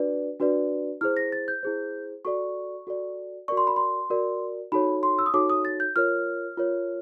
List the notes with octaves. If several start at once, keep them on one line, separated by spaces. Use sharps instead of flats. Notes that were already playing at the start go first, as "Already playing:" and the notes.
Already playing: D4 F#4 B4 D5
D4 F#4 B4 D5
E4 G#4 C5 F6
A#6
A6
G6
E4 G#4 C5
F#4 A4 D5 C#6
F#4 A4 D5
F#4 A#4 D5 C#6
C6
B5
C6
F#4 A#4 D5
D#4 F#4 A4 C#5 B5
C6
E6
D#6
D#4 F#4 A4 C#5 D6
D#6
A6
G6
F4 A#4 C#5 F6
F4 A#4 C#5